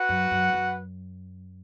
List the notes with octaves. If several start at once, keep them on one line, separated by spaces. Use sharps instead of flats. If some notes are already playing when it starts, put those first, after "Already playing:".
Already playing: F#4 B4 F#5
F#2
F#2
F#2